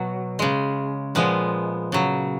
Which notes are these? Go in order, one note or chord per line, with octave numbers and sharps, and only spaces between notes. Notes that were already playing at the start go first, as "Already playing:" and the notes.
Already playing: B2 F#3
C#3 G#3
A#2 F3 G#3 B3
C#3 F#3